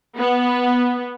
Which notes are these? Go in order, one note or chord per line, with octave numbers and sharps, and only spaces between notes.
B3